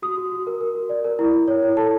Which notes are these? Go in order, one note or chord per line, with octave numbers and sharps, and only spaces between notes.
F#4 D#6
F#4
F#4
A#4
A#4
F#4
D5
A#4
E4
E4
C#5
E4
A4 A5